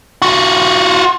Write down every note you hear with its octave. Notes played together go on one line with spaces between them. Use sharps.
F4 F#4